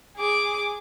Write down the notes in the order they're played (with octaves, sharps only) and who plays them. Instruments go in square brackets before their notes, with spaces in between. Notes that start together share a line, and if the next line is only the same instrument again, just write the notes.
[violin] G#4 D6